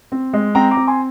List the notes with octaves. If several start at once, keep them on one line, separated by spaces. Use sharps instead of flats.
C4
G#3
C4 G5 A#5
A#5 D6
C4
G#5 C6